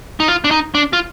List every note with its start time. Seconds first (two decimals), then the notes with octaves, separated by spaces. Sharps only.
0.20 D#4
0.28 F4
0.44 D4
0.51 D#4
0.75 D4
0.93 F4